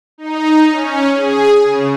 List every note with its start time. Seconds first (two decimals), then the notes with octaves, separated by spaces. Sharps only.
0.18 D#4
0.72 C#4
1.15 G#4
1.64 C#3